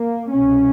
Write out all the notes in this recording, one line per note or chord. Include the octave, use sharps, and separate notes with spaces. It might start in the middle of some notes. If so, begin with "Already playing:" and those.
Already playing: A#3
C2 B2 C#4